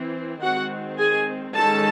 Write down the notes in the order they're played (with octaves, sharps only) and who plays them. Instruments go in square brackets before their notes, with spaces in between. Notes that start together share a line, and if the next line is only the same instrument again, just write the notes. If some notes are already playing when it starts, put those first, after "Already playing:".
Already playing: [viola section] E3 C4
D#3 G#3 C4 F#4 F#5
G#4 G#5
D#3 G#3 C#4 A4 A5